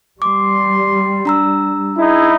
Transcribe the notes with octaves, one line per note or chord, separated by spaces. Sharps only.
G3 C6 D6
D4 A#5 E6
D#4 E4 G#4